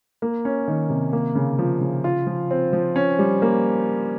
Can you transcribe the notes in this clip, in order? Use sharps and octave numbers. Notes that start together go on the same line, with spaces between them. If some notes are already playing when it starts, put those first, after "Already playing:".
A#3
C#4
D#3
C3
A#3
C#3
F3
C#3
F4
F3
C4
F3
C#4
G3
A#3